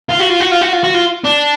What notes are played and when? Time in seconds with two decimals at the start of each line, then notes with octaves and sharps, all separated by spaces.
0.09 F4
0.19 F#4
0.29 F4
0.40 F#4
0.52 F4
0.61 F#4
0.73 F4
0.83 F#4
0.94 F4
1.24 D4